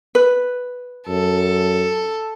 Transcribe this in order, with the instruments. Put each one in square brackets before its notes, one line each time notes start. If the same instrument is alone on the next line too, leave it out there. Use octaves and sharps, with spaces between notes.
[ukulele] B4
[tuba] F#2 [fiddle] A4